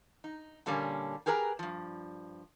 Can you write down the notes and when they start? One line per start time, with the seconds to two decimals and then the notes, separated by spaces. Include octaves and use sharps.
0.24 D#4
0.66 A#2 D3 G3 A#3 C#4
1.26 G4 G#4 A#4 B4 D#5 A#5
1.59 G2 F3